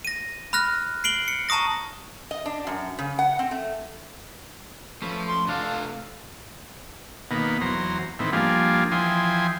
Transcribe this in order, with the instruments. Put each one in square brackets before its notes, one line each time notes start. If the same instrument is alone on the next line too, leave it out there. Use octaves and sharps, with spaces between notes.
[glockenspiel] A#6 D#7
B5 F6 F#6 A#6
C7 D7 F#7 G7
C#7
A5 A#5 C#6 D#6 A#6
[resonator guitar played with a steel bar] D#5
D4
F#2
C#3
F#5
C4
A3
[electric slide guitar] F3 [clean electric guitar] A3 C#4 B4
[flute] C6
[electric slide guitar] C3 F4 [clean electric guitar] A3 F5 [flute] D4
[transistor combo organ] B2 D#3 A#3 B3
E2 F#3 C5 A#5
A2 D#3 E3 B3 C4
F3 G3 A#3 D4 F4 G#4
E3 F3 G5 G#5 C6 D#6